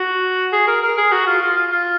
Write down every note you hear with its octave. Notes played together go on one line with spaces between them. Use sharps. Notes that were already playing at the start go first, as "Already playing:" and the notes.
Already playing: F#4
G#4
A#4
A#4
G#4
F#4
F4
F4
F4
F4